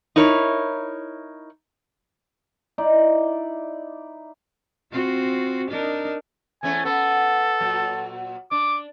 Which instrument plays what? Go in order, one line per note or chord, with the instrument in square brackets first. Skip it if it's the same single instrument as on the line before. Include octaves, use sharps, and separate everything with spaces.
[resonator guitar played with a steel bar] D#4 E4 A#4 C#5
[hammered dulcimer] D#4 E4 D5
[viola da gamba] C4 F4 F#4
D4 D#4 A#4
[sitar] E2 A3 C#4 [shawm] G#5
[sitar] B3 [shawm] A4
[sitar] A#2 F#3
[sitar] D4 [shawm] D6